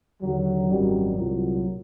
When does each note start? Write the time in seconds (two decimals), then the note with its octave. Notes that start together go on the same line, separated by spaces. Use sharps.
0.22 D#2 D3 F#3
0.69 G#1 F#2 D#3 F#3 G3
1.16 C2 A#2 F#3